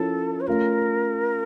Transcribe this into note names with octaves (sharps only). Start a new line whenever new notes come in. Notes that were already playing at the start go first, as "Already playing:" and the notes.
Already playing: F3 C#4 E4 A4 A#4
C#5
A3 C#4 F4 A#4